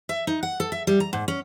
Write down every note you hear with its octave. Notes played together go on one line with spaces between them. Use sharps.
E5
D#4
F#5
A4
E5
G3
A#5
G#2
C#4